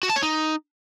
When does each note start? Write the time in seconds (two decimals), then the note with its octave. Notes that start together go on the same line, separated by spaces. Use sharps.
0.03 F#4
0.10 A5
0.16 C#5
0.23 D#4